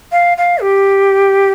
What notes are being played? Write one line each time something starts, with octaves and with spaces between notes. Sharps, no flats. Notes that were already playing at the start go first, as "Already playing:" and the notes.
F5
F5
G4